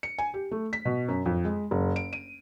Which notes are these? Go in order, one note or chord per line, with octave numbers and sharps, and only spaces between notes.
C#7
G#5
G4
A3
B6
B2
F#2
F2
G#3
F#1
D7
D#7